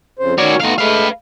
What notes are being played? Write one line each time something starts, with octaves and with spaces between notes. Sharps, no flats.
F2 C#3 C5
D#3 C#4 F#4 C#5 D5
A3 B3 D#4 F#4 F5
G#3 A3 B4 F5